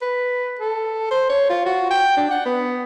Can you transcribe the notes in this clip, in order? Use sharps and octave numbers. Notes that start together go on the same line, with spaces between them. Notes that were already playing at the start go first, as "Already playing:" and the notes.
B4
A4
C5
C#5
F4
F#4
G5
D4
F#5
B3